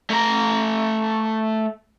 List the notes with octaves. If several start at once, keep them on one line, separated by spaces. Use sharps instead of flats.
A3 A#5